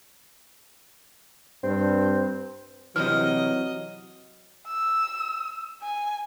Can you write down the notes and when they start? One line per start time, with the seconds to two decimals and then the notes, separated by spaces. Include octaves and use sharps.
1.63 G2 C4
2.96 C3 E3 F#3 D#5 F6
4.67 E6
5.82 G#5